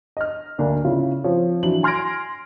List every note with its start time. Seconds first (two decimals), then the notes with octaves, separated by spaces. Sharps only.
0.17 D#5 F6
0.58 D2 A#3 D4 A#4 D5
0.85 C#3 E4 F4
1.24 F3 C4 C#5
1.63 E3 F#3 D4 F#7
1.83 G#5 C6 F6 G#6 A#6 D7